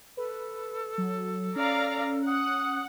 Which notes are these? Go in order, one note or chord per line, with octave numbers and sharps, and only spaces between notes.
A4 B4
F#3
C#4 D5 F5 A#5
F#5 D#6